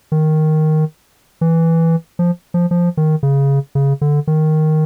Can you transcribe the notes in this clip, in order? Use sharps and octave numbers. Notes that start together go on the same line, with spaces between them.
D#3
E3
F3
F3
F3
D#3
C#3
C#3
D3
D#3